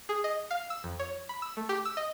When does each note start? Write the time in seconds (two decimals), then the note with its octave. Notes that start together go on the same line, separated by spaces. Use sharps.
0.09 G#4
0.24 D#5
0.51 F5
0.70 E6
0.84 F2
0.99 C#5
1.29 B5
1.42 E6
1.57 A3
1.69 G4
1.85 E6
1.97 D#5